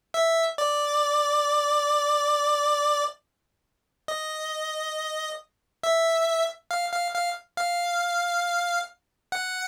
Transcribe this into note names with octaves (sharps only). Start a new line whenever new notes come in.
E5
D5
D#5
E5
F5
F5
F5
F5
F#5